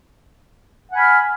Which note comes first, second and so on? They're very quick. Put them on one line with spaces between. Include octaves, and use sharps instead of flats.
F#5 G#5 B5 F6